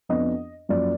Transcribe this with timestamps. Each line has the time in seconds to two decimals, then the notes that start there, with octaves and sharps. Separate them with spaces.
0.09 F2 F3 B3 D4 D#5
0.69 F#2 F3 A#3 D5